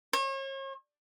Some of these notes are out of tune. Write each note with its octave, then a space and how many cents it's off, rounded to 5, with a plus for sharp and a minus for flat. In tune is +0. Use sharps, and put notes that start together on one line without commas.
C#5 -40